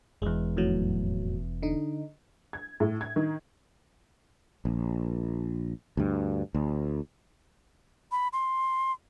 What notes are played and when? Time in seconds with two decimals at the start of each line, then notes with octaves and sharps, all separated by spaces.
0.22 E1 E2 G#3
0.57 F2 A2 F#3
1.62 D3 D#4
2.53 G#6
2.80 A2
3.01 G#6
3.16 D#3
4.65 A#1
5.97 D2 G2
6.54 D2
8.12 B5
8.33 C6